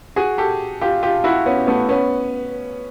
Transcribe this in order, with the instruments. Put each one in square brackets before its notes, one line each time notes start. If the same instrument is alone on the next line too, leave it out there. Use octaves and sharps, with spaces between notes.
[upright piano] F#4 G#4
G4 A4
F4 G4
F4 G4
E4 F#4
B3 C#4
A3 B3
B3 C#4